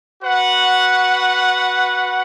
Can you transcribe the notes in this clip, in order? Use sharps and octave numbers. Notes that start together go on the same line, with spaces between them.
F#4 B4 F#5